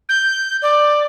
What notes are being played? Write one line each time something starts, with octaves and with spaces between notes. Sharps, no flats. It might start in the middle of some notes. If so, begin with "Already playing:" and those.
G6
D5